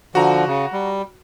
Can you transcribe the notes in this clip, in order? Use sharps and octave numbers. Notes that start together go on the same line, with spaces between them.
D3 F3 F#4 A#5
C#3
G3